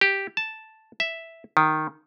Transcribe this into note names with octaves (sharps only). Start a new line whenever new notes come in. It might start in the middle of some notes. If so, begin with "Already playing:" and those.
G4
A5
E5
D#3